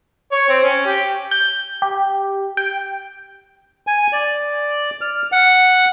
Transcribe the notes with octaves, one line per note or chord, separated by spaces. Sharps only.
C#5
C4
C#4
G4
G6
G4
G5
G#5
D5
F6
F#5